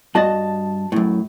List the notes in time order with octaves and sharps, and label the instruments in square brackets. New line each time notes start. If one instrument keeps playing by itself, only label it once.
[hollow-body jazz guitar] G2 F#4 D#5 [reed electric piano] A5 A6
[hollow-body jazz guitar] F#2 A2